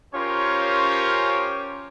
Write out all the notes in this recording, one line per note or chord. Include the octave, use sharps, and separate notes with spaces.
C#4 F4 G4 A#4 C5 C#5